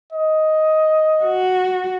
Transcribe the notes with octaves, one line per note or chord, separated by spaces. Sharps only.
D#5
F#4